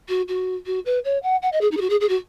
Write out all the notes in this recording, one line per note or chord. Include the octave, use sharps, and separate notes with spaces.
F#4
F#4
F#4
B4
C#5
F#5
F#5
D#5
G#4
D#4
G#4
F#4
G#4
G#4
F#4